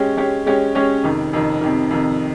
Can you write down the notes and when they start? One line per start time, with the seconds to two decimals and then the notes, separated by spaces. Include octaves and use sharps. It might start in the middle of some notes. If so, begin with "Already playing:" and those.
Already playing: G#3 C#4 G4 C#5
0.17 G#3 C#4 G4 C#5
0.46 G#3 C#4 G4 C#5
0.75 G#3 C#4 G4 C#5
1.04 F2 C3 D#3
1.33 F2 C3 D#3
1.61 F2 C3 D#3
1.91 F2 C3 D#3